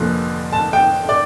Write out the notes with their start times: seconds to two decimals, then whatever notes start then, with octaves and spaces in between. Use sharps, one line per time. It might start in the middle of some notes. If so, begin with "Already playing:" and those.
Already playing: F1 F2 D3 F3 A#3
0.53 A5
0.73 G5
1.09 D5